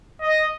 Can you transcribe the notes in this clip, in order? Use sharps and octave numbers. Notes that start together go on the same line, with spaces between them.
D#5